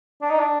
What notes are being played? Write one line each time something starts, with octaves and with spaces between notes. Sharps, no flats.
D4
D#4
D4